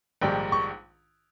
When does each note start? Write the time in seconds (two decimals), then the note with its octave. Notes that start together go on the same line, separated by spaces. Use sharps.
0.21 A#1 G#2 D#3 G3 G5
0.52 C#6